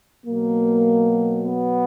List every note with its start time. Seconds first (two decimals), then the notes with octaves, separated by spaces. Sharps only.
0.25 B2 F#3 A#3
1.43 B3